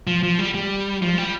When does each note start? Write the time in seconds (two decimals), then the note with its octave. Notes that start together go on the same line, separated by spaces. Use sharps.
0.07 F3
0.23 F3
0.39 G3
0.54 G3
1.02 F3
1.18 G3